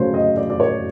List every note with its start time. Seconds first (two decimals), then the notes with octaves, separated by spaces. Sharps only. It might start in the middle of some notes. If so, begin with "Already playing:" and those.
Already playing: C#3 F#3 A3 C5 C#5
0.14 D#5
0.37 D5
0.50 D5
0.60 C#5